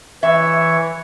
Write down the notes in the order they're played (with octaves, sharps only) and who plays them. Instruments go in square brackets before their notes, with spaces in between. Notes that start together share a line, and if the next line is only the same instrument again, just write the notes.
[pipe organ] E3 C#5 [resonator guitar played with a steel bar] E5